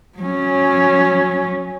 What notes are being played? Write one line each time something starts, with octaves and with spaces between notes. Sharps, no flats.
F#3 C#4